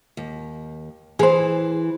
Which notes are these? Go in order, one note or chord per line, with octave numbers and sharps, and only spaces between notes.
D#2
E3 G#4 C5